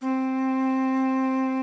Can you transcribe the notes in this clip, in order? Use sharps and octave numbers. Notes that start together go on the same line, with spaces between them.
C4